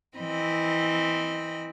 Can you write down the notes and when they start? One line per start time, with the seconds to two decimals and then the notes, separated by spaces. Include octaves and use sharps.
0.18 E3 C4 D#5 B5